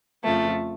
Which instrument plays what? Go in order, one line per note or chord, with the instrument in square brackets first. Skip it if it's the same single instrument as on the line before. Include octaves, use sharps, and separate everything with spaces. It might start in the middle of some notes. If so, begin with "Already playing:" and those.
[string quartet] F2 C#3 F3 A3